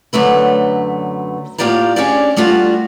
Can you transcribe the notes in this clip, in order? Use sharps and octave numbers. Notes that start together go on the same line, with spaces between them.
F#2 D3 F#3 A3 B4
A2 A#3 F4 G4 D5 A#5
C#4 D4 G4 G#4 D5
G3 A3 D4 F4 F#4